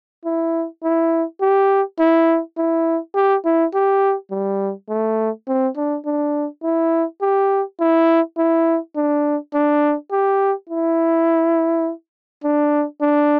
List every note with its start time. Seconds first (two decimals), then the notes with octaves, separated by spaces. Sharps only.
0.25 E4
0.83 E4
1.41 G4
1.99 E4
2.58 E4
3.15 G4
3.45 E4
3.74 G4
4.31 G3
4.89 A3
5.48 C4
5.76 D4
6.06 D4
6.63 E4
7.22 G4
7.80 E4
8.37 E4
8.96 D4
9.54 D4
10.12 G4
10.69 E4
12.44 D4
13.01 D4